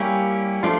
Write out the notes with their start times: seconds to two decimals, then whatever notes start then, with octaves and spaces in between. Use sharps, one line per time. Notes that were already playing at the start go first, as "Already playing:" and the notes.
Already playing: G3 A#3 C#4 E4 G4
0.63 F3 A3 D4 F4